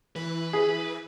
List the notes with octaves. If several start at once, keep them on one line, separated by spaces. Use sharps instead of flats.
E3 B4
G#4